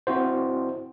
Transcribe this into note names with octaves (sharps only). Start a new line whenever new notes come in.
C4 E4 F#4 C5